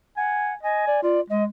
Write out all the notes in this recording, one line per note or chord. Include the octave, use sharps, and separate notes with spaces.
F#5 G#5
D#5 G#5
D5
F4 D5
G#3 D#5